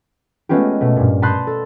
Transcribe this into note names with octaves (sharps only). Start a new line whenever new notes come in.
G#3 A3 B3 C#4 F4 G4
B2 A3
G2 A#2
A5 B5 C6 D#6 F#6 G6
A4